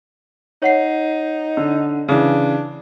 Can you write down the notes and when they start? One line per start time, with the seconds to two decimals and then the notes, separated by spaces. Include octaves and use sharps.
0.62 D#4 C#5 F#5 C7
1.57 D3
2.08 C#3 E3 D4